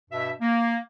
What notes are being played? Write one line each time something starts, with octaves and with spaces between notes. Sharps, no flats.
G2 B2 E5
A#3